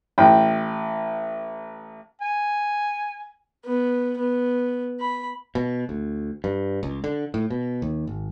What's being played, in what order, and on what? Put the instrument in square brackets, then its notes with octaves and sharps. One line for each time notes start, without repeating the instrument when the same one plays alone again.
[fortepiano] A1 G5
[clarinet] G#5
[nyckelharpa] B3
B3
B5
[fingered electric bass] B2
D2
G2
C#2
D3
A2
B2
D#2
G#1